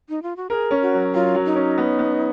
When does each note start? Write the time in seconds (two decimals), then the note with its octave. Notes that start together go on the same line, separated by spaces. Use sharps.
0.09 D#4
0.23 F4
0.37 F#4
0.50 G#4 A#4
0.71 C#4
0.82 F#4
0.93 F#3
1.13 F#3 F4
1.35 F#3
1.45 D#4
1.56 C#4
1.78 B3
1.99 B3